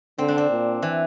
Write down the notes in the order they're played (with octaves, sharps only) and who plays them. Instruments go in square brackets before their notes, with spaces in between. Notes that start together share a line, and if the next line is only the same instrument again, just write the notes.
[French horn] D3 [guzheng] C4
[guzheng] D4
C4
[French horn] A#2
[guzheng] E3